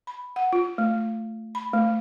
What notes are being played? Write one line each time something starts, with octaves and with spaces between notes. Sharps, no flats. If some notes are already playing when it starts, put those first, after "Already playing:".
B5
F#5
F4
A3
B5
A3